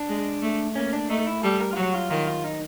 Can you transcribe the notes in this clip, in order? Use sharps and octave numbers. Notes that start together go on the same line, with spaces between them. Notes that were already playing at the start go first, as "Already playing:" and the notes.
Already playing: D4
G#3
A3
A#3 C#4
D4
A3 D#4
E4
G3 A4
A#4
F4
F#3 F#4
F4
D#3 F4
F4
D#4